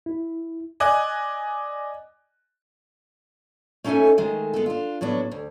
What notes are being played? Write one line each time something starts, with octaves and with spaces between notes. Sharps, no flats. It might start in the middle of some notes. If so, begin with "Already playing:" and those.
E4
D5 D#5 G#5 D6 F#6
A3 C#4 D#4 A4 E5 G#5
D#3 G#3 A3
G#3 B3 A4
D4 F4
A2 F#3 B3 D4
D2